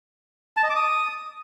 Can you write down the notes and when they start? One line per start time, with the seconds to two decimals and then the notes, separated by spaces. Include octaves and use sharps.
0.57 A5
0.63 D#5
0.70 D6
0.76 D#6